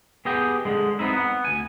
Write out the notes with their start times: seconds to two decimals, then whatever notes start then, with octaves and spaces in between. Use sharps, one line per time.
0.25 B3 G4 G#4 D#5 G5
0.65 D3 G#3
0.99 B3 C4 D#4 E4
1.14 B3 F#5
1.45 D2 G#5